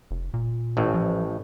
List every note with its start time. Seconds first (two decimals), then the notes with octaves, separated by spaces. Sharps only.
0.11 F1
0.34 A#2
0.77 A1 A2
0.94 F3